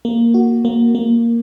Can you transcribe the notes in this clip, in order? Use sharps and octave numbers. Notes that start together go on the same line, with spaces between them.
A#3
F#4
A#3
A#3